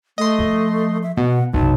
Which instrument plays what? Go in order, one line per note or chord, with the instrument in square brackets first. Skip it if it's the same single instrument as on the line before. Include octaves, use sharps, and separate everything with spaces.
[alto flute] A3 [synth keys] D#5 C6
[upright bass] F3
[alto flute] E5
[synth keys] B2 [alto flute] F#5
[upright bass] F#1 C3 [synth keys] B1 [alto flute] A5